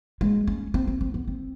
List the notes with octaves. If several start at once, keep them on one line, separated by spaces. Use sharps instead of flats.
G#3
C#4
C4
C4
C4
B3
C4